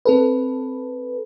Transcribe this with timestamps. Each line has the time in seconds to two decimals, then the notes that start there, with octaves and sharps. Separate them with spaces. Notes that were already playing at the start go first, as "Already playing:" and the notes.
0.05 C4 A4 B4